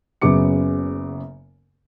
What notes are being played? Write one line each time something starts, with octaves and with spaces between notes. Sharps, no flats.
F#1 F#2 C#3 B3 D6 C#7